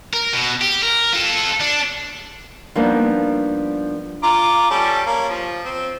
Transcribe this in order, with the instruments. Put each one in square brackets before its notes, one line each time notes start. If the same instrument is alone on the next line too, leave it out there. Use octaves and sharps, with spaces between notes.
[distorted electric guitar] A#4
B2
G4
A#4
F4 A4
D4
[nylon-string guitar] F3 G3 A#3 B3 D4 D#4
[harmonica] F4 A#5 D6
G3 C#4 A4
A#3 C#5
F3
C4